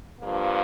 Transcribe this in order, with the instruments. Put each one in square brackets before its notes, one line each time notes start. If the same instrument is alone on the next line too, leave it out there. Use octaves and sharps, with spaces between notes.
[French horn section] G2 F3 A#3